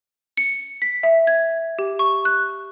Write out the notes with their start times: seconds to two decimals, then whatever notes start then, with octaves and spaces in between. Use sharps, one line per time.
0.37 C#7
0.82 B6
1.03 E5
1.27 G#6
1.79 G4
1.99 C#6
2.25 F#6